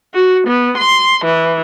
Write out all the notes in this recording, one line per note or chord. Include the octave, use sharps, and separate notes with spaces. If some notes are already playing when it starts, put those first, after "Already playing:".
F#4
B3
C6
E3